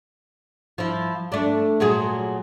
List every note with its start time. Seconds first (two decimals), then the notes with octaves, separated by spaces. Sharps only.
0.78 F3 E4
1.32 A3 D4
1.80 A#2 F#3 G#4